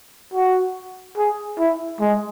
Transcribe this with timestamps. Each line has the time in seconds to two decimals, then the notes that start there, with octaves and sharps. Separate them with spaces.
0.34 F#4
1.17 G#4
1.59 E4
2.00 G#3